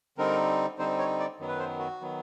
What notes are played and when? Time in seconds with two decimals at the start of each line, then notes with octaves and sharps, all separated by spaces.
0.18 D3 G3 C4 D#4 A#4
0.78 D3 G3 C4 D#4 C5
0.99 C#5
1.19 D5
1.39 F#2 D#3 F#3 B3
1.48 B4
1.59 C5
1.79 F#4
2.01 D#3 F#3 B3